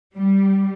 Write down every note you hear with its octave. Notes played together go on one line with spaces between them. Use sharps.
G3